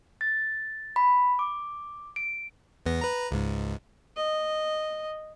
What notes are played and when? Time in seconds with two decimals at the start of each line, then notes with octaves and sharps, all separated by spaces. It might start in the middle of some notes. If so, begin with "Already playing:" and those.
0.21 A6
0.96 B5
1.39 D6
2.16 D7
2.86 E2 B3 A#6
3.01 B4 A#5
3.31 C#2 G#2
4.17 D#5